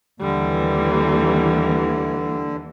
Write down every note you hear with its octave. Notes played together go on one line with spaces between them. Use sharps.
D#2 D3 E3 G3